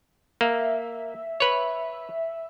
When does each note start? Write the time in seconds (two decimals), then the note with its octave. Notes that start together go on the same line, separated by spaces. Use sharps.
0.41 A#3 E5
1.40 B4 C#5